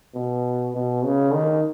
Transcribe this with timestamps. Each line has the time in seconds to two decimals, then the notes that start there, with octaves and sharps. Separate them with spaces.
0.15 B2
0.75 B2
1.04 C#3
1.34 D#3